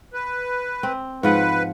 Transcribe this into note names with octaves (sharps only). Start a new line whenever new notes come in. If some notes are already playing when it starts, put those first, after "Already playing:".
B4
C4
G#2 F3 B4 F#5